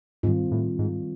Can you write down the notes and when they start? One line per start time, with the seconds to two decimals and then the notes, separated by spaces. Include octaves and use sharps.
0.23 G#2 D#3 G3 C4 F4
0.51 A2
0.79 G#2